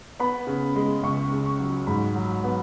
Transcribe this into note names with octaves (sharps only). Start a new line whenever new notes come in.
B3 B5
C#3
G#3
C#2 C#6
C#3
C#6
F#3
G#2 B5
F#3
B3